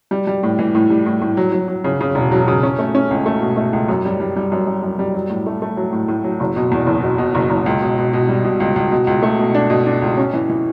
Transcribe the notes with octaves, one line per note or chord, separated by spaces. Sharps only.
G3
G3
A2
E3
A2
G3
A2
A2
F#3
F#3
F#3
C#3
C#3
E1
F#3
C#3
C#4
A3
C#4
C#2
A3
B2
A3
C#2
F#2
G3
G3
G3
F#2
F#2
F#2
G3
F#3
A2
A3
A3
F#3
A2
A2
F#3
F#1
B2
E2
F#1
B2
B2
F#1
F#1
C#2
B2
B2
B2
G3
B2
C#2
C#2
B2
C#2
A3
B2
D4
B2
D4
C#2
C#4
E3
E3